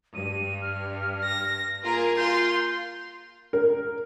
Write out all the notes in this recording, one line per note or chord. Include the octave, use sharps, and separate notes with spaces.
G2 D#7
F6
A#6
A#3 F4 G#4 A#4
F4 C6 G6
A#4